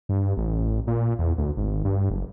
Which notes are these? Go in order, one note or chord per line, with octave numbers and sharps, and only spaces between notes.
G2
A1
A#2
E2
D2
G#1
G2
F#1